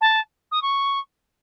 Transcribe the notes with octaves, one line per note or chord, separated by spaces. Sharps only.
A5
D#6
C#6